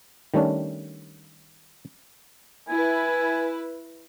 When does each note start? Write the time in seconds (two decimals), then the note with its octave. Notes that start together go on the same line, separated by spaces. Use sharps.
0.34 D#3 G3 A3 C#4 D4
2.68 E4 B4 G#5